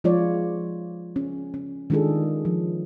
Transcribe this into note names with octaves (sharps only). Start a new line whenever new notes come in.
F3 G#3 F4 C#5 D5
C#4
C#4
D#3 G#3 D4 F4 G#4 A4
F3